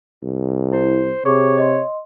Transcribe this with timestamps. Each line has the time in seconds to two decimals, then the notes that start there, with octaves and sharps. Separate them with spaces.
0.23 C2
0.73 E4 C5
1.25 C3 G#4 C#5 C#6 D6
1.58 D#5 C6